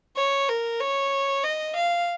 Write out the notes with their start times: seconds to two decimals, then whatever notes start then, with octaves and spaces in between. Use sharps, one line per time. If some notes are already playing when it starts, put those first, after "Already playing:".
0.17 C#5
0.49 A#4
0.80 C#5
1.44 D#5
1.75 F5